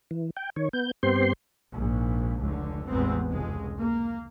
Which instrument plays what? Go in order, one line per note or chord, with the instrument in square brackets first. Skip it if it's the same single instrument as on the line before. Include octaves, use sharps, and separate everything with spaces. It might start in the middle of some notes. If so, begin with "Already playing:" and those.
[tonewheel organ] E3
G5
D#3 C#5
B3 G6
G2 B3 C4 G4 C5 C6
[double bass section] A#1 G#2
F1 C#2 D3
A1 E2 G#3 B3 C4
F1 C#2 G#3
A#3